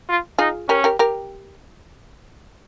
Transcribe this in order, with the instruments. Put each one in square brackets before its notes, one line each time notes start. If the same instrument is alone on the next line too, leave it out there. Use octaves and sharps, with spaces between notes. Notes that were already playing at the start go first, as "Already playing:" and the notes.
[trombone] F4
[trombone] D#4 [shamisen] F4 G#4
[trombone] C#4 [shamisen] G4 A#4
[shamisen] G4 A#4
G4 A#4